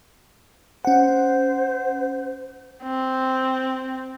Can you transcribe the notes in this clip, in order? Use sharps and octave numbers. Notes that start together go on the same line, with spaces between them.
C#4 C5 F#5
C4